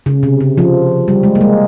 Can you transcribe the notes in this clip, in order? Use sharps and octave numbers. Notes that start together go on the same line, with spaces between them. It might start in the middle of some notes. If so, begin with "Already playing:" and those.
C#3
C3
C#3
F3
G3
G#3
A#3
G#3